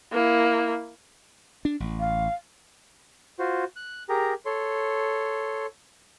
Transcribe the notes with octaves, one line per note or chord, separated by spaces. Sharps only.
A#3 E4
D4
A1
F5
F4 F#4 C5
F#6
G4 G#4 A#4 A#5
A4 C#5 C6